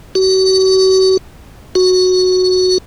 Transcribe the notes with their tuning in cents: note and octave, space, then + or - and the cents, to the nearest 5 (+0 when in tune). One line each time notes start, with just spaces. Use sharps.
F#4 +40
F#4 -5